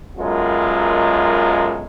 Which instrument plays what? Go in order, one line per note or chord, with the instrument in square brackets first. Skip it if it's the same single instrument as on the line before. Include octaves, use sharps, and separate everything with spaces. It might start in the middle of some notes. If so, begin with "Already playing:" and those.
[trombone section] B1 F#2 G#3 F4 A#4